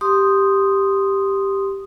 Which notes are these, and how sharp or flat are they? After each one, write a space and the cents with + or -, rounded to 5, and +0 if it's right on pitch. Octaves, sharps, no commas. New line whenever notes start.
G4 +0 C6 +0 D#6 -5